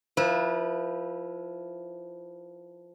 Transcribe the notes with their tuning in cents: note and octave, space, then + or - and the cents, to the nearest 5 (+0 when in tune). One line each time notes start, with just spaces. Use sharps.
F3 +0 E4 +0 B4 -35